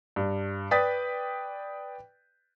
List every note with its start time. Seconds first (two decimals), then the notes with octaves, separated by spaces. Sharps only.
0.16 G2
0.71 B4 D5 G5 D#6 A6 B6